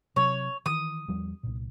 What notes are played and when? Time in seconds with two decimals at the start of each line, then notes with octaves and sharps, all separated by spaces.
0.16 C3 F#3 C#5
0.66 D#3 E3 D#6
1.08 E2 F3 G3
1.43 C2 A#2